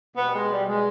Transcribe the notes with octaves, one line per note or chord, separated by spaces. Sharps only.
B2 G3 B3
G#3
G3
G#3